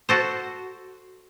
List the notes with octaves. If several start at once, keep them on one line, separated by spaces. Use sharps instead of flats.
F#4 A4 C5